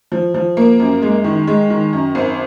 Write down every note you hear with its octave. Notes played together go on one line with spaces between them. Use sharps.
F3
F3
A#3
F#2
G#3
D#3
G#3
D#3
F#2
G#1